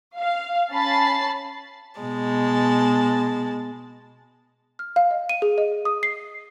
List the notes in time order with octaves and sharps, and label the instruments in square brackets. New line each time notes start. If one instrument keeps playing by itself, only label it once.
[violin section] F5
C#4 A5 B5 A6 C7
[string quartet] B2 G#3 A5
[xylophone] F6
F5
D#5
D#7
G#4
D#5
D#6
C7